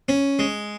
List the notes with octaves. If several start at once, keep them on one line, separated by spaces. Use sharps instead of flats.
C#4
G#3